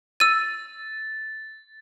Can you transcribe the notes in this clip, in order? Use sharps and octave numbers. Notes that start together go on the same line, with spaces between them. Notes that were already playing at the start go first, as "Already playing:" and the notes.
E6 A6 D#7